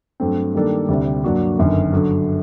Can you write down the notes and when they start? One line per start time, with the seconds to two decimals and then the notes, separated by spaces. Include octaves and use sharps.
0.20 G2 F#3 A3 C4
0.55 D#3 G3 A#3 D4 A4
0.89 D2 C3 G3 D4
1.24 G2 F#3 A#3 D4 F#4
1.58 G1 F#2 D#3
1.93 G2 D3 F#3